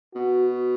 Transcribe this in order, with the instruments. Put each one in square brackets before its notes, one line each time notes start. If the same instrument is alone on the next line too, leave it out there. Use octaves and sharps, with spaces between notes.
[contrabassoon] B2 [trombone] F#4